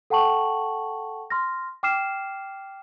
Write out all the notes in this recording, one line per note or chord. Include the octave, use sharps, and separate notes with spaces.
A4 F#5 G5 A5 C#6 F#7
C6 F6 A#6
G5 D6 F6 C7 E7